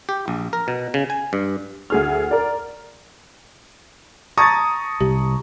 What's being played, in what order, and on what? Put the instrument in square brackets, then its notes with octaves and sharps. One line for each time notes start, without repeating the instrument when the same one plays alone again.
[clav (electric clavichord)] G4
A#1
A#4
B2
C#3
G#5
G2
[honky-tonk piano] D2 G#4 F6
A#4 D5
[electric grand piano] A5 A#5 D#6 [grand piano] C#6 G#6 A6
[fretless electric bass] C2 [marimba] G4